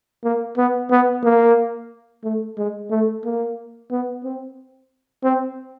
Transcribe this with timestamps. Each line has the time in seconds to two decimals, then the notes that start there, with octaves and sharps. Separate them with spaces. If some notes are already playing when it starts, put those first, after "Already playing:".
0.24 A#3
0.57 B3
0.90 B3
1.24 A#3
2.23 A3
2.58 G#3
2.90 A3
3.24 A#3
3.91 B3
4.24 C4
5.23 C4